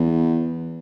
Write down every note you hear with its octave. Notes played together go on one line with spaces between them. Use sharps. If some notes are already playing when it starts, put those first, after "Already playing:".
Already playing: E2